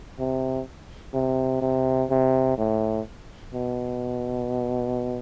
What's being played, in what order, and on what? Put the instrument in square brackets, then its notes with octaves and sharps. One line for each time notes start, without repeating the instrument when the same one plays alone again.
[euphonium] C3
C3
C3
C3
A2
B2